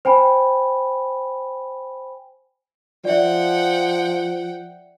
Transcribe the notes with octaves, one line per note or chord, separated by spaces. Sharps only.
C5 G5 G#5 B5
F3 D5 E5 F#5 G5